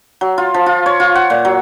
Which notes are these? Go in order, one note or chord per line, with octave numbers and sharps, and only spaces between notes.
F#3
F4
F3
F4
C#5
F4
F#5
A#2
F#3